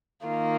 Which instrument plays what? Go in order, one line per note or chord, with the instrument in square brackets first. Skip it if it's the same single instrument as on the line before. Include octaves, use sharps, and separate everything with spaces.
[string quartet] D#3 A#3 F4